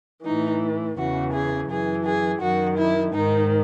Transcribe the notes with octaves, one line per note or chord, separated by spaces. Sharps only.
A2 E3 D#4
E2 C#3 E3 F#4
G#4
F#2 E3 G#4
G#4
F#2 D#3 F#4
E4
G#2 D#3 D#4